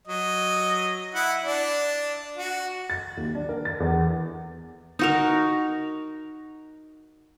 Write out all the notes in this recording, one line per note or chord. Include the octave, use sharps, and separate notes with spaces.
F#3 D#5
E4 F#5
D4
F#4
A6
D#2
D4
A#4
A6
E2
D#4 F#4 A#4